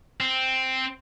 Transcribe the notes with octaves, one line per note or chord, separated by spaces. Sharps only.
C4